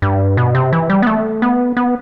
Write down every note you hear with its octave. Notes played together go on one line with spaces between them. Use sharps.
G2
B2
C3
E3
G3
B3
A3
B3
B3